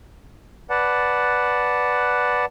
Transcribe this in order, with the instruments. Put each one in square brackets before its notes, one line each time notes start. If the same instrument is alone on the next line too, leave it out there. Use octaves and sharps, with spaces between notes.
[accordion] B4 D5 F#5 A5